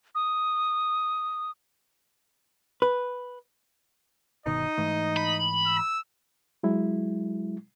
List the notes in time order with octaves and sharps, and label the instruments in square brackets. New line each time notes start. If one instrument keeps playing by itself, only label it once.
[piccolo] D#6
[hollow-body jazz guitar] B4
[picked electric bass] G1 B2 D#3 [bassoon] D#4 [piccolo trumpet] D#5
[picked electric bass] G#2 E3 A3
[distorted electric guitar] B5
[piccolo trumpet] E6
[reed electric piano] F#3 G#3 E4